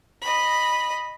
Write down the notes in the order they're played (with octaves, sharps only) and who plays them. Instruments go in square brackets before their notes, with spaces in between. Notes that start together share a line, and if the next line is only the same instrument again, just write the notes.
[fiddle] D#5 B5